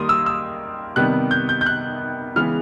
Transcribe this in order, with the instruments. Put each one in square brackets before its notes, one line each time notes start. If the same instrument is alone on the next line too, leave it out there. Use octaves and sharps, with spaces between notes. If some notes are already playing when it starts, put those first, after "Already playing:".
Already playing: [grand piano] D#3 G3 A#3 C6 D#6
E6
E6
C3 D#3 G3 B3 F#6
G6
G6
G6
F#6
C#3 E3 G#3 B3 F6